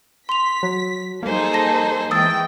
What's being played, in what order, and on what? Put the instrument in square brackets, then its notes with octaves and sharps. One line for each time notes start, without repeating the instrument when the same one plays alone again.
[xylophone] C6 F7 [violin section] B6
[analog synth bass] F#3
[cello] G3 C5 [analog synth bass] A#3 [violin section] D#4 G#4 A4
[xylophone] A5 A#6
[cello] E3 G#3 [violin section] G5 [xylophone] D#6 E6 A6